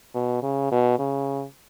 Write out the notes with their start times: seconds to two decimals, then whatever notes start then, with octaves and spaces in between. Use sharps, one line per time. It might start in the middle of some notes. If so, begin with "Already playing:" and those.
0.14 B2
0.43 C#3
0.71 B2
0.99 C#3